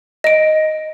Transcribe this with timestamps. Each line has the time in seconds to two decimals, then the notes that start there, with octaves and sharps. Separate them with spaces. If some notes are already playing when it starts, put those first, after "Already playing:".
0.24 D#5 D7